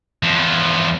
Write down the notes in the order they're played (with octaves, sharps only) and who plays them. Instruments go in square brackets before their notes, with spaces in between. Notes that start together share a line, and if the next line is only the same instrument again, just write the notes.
[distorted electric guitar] E2 F3